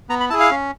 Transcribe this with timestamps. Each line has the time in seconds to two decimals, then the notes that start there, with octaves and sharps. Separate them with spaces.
0.09 B3 A#5
0.20 B5
0.30 E4 G#4 A5
0.40 F5
0.51 C#4